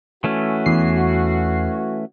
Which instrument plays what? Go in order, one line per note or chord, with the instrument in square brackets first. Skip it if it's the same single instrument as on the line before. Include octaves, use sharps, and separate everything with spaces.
[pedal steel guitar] E3 A3 C#4 [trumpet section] F#4
[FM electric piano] E2 C7